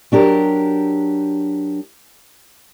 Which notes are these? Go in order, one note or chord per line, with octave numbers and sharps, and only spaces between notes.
F#3 D4 G4 A#4